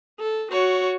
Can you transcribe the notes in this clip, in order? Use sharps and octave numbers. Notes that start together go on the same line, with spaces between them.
A4
F#4 C#5